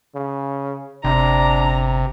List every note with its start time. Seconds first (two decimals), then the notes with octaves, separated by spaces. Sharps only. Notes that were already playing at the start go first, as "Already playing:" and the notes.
0.15 C#3
1.04 G1 C3 D4 A#5